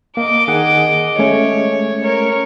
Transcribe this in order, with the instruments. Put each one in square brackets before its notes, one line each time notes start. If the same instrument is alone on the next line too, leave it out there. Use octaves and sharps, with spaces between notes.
[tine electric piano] A#3 [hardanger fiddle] D#5 D6
[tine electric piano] D#3 G#4 F#5
[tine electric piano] G#3 A3 C#4 [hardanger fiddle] C#5
[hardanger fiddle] A#4 C#5